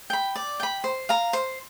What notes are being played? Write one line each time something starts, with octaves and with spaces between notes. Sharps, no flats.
G5 B5
D5
G5 B5
C5
F5 A#5
C5